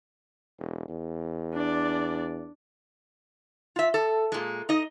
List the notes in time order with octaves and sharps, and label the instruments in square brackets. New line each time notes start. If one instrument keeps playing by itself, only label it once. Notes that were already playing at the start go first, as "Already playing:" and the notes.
[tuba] E1
E2
[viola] D4 D5
[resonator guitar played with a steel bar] F4 E5
A4
A#2 G#3
D#4 D#5